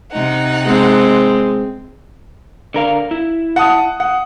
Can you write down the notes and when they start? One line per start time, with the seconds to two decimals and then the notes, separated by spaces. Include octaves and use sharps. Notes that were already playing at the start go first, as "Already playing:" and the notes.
0.12 C3 D#4 F#5
0.65 G#3 C4
2.74 D3 A#4 F5
3.11 E4
3.56 F#5 A5 D#6
4.00 F#5